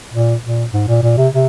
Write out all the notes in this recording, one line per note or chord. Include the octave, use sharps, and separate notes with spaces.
A#2
A#2
G#2
A#2
A#2
C3
C3